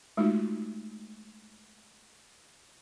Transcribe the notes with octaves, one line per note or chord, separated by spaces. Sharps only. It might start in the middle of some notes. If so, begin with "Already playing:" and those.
G#3 A3 D#4 F4 F#4